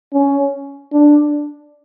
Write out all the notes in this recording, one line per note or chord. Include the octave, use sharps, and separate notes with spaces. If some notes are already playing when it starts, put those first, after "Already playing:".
C#4
D4